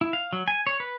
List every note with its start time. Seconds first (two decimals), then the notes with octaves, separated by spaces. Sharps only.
0.01 E4
0.13 F5
0.33 F#3
0.48 G#5
0.67 C#5
0.80 B4